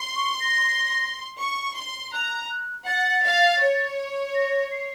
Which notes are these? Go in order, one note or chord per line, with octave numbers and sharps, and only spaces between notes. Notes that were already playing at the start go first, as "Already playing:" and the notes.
Already playing: C6
C#6
A#6
C#6
C6
A#5 F#6
F#6
F#5 A6
F5
C#5
A#6
C7